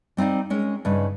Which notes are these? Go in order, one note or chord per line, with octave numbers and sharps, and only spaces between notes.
G3 C4 D#4 D5 F5
G#3 C#4 A#4
G2 C#3 D#4 B4